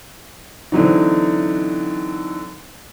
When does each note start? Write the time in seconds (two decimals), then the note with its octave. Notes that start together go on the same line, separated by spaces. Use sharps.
0.72 D3 E3 F#3 C4 D#4